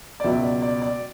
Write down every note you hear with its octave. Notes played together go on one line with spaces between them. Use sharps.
D5
C#2 B2 F#3 E5
D5
D5
D5